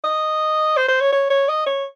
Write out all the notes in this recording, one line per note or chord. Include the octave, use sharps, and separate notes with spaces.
D#5
C5
C5
C#5
C#5
C#5
D#5
C#5